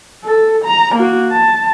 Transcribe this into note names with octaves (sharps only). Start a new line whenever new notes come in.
A4
A#5
A#3 F#4
A5